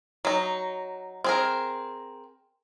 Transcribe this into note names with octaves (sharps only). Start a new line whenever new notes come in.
F#3 D#4
C4 G#4 A#4